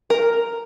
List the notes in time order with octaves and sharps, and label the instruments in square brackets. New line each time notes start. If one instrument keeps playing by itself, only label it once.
[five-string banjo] A#4